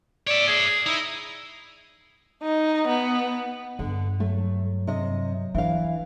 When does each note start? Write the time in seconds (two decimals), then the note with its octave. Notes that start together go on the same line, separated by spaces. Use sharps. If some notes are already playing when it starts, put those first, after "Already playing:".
0.27 C#5 D5 E5
0.47 G#4
0.86 D#4 E4
2.42 D#4
2.88 B3
3.79 G2 D3
4.20 F#3 A3
4.87 C3 D#5
5.55 E3 D4 F5